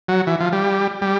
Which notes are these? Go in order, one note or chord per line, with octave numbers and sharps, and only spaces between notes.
F#3
E3
F3
G3
G3